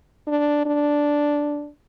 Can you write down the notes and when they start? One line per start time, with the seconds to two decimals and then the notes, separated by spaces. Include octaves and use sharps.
0.27 D4
0.66 D4